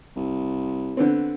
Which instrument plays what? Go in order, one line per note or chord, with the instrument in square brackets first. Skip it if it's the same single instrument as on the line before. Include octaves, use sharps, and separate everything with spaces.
[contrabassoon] C2
[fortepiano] D3 B3 C4